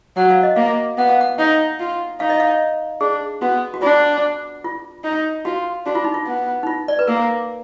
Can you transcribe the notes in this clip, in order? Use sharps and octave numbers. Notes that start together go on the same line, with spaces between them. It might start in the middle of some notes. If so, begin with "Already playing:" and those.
F#3 F#5
F5
D#5
A#3 F5
B3 F#5
F5
F#5
D#4 F#5
F4
D#4 F5
D#5
F5
D4 G#4
B3 F#4
F#4
D4 F4
F4
D#4
F4 F#4
D4 F#4
F4
D#4
F4
B3
D#4
F4
D5
B4
A#3 A#4